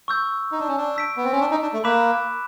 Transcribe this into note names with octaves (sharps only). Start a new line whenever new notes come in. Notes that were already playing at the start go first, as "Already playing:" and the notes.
C#6 E6 G6
D#4
D4
C#4
D4
E6 G6 B6 D7
B3
C4
C#4
D4
D#4
D4
A3
A#3 B5 D6 F#6 B6 E7